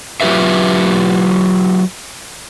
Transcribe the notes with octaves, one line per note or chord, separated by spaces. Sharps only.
F#3 F4 G4 B4 E5